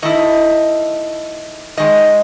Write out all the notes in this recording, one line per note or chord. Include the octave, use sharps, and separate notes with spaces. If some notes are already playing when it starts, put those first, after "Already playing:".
D#3 A3 E4 D#5
G#2 D#3 G#3 D#5